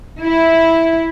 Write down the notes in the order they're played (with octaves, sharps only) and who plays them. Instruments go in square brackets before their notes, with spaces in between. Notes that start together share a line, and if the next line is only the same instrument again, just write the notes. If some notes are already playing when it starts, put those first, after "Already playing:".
[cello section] E4